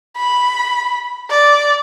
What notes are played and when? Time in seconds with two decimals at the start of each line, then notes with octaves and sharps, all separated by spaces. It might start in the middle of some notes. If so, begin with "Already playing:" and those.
0.17 B5
1.30 D5